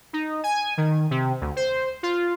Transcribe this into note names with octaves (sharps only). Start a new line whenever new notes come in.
D#4
G#5
D#3
C3
D2
C5
F4